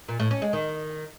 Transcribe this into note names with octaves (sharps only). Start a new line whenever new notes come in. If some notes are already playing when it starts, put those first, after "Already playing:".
A#2
A2
C#4
G#3
D#3